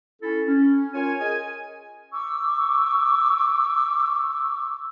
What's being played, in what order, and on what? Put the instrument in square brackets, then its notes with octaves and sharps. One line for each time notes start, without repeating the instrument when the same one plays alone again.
[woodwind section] C#4 E4 A4
C#4
F4 A#4 C#5 G#5
G#4 A#4 D#5 G#5
[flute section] C#6 D6 E6